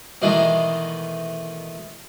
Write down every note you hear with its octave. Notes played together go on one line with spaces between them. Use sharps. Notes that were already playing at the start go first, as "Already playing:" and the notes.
B2 D#3 E3 G#3 A3 D#4